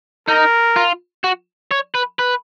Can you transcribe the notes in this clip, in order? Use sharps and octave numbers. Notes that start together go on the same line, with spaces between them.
D#4 A#4
F4
F#4
C#5
B4
B4